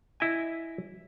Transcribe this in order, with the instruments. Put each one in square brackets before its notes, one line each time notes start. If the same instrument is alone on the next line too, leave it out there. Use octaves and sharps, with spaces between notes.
[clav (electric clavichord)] E4 D#5 G#5